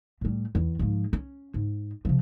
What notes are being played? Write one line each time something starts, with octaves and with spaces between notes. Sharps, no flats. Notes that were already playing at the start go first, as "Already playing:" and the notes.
A2 G3
E2
G#2 F3
C#4
G#2
C3 F3